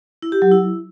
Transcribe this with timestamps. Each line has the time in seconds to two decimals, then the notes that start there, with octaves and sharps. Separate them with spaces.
0.22 E4
0.32 G4
0.42 F#3
0.51 E4